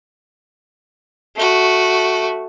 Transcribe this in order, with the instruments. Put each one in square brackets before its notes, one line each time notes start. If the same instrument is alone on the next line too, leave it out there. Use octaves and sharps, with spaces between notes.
[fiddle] A3 F#4